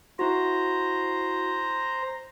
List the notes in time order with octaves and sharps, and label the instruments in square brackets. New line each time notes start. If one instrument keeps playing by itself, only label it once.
[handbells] E4 F#4 [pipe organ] C5 A#5